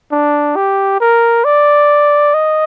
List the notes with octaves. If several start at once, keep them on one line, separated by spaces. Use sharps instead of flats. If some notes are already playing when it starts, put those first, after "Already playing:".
D4
G4
A#4
D5
D#5